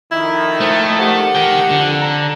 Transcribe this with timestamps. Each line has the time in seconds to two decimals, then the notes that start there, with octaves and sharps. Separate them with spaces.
0.12 F2 D#3 E4
0.60 A3 C5
1.00 G4 F#5
1.35 A#4 G5
1.70 F2 D3
2.01 A#5